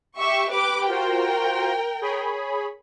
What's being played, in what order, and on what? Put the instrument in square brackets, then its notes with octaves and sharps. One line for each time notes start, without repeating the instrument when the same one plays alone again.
[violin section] G4 E5 C#6
G4 B4 D6
[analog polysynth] F4 F#4 C5 [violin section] A#4 G5
[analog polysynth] G#4 C#5 B5